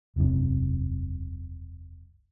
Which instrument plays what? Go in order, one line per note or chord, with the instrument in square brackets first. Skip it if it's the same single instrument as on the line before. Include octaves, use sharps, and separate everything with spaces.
[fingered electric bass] E1 C2 F#2 C3